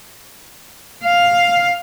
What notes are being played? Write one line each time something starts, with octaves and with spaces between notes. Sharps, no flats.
F5